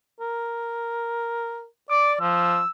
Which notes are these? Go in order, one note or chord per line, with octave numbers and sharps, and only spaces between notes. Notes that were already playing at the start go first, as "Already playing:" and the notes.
A#4
D5 D6
F3 E6